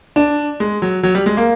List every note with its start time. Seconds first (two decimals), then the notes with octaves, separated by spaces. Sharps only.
0.16 D4
0.60 G#3
0.82 F#3
1.03 F#3
1.15 G3
1.26 G#3
1.37 A#3